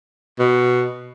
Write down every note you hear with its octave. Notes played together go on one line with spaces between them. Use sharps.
B2